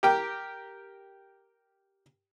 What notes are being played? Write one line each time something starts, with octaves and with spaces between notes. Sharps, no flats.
G4 A#4 G5